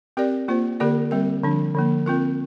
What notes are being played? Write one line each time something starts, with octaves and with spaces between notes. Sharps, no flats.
C4 G4 A#4 D5
A#3 F4 C5
D3 A#3 G4 A#4 D5
G3 C4 A#4
D3 F3 D4
D3 F3 A#3
C4 F4 A#4